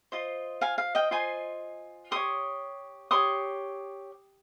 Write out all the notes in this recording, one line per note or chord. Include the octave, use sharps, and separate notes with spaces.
F4 C5 D#5
F5 G#5
F5
D#5 G5
F4 C5 D#5 G#5 C6
G4 C#5 C6 D#6
G4 C#5 C6 D#6